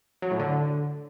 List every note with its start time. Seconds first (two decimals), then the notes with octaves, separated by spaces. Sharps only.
0.22 F#3
0.31 A2
0.40 D3